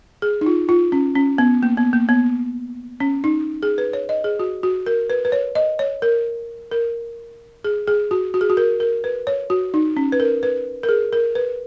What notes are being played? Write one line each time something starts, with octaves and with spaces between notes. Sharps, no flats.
G#4
D#4
F4
F4
C#4
C#4
B3
A#3
B3
A#3
B3
C#4
D#4
G#4
B4
C#5
D#5
G#4
F#4
F#4
A#4
B4
B4
C#5
D#5
C#5
A#4
A#4
G#4
G#4
F#4
F#4
G#4
F#4
A#4
A#4
B4
C#5
F#4
D#4
C#4
B4
A#4
B4
A#4
G#4
A#4
B4